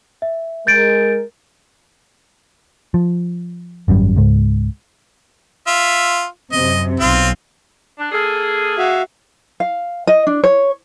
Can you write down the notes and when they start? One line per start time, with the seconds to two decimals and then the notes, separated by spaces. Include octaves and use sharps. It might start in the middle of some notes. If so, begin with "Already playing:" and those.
0.22 E5
0.67 G#3 A#4 G6 A6 D7
2.94 F3
3.88 G#1 F#2 B2 G3
4.16 C#2 G#2
5.67 F4 E5
6.52 F#2 C3 D#5
7.00 B1 C4 F4
7.99 D4
8.12 A#3 G#4 A4
8.78 F#4 E5 F5
9.60 F5
10.07 D#5
10.27 D4
10.44 C#5